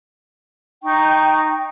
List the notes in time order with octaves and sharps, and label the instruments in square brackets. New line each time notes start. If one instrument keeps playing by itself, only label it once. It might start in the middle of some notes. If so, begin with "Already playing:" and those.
[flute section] D#4 G5 C#6